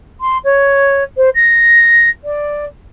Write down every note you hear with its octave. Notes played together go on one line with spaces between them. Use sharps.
C6
C#5
C5
A#6
D5